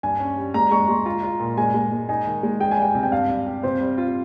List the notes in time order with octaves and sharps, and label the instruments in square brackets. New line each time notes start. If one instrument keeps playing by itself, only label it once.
[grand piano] G2 [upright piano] G#5
[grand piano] C#4
G3
[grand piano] G#3 [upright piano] A#5
[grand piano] G#3 [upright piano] C#6
[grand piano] G#3 [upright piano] C6
[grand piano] F4 [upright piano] A#5
[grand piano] F4
A#2
[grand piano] G#3 [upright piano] G#5
[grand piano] G#3
G#3
[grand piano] D#4 [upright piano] G#5
[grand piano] D#3
G#3
[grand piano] G#4 [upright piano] G5
[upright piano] G#5
[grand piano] G3 [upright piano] G5
[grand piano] C3
[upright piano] G5
[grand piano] G2 [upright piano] F5
[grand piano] G2
G4
[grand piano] C3 [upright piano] C5
[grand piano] G3
F4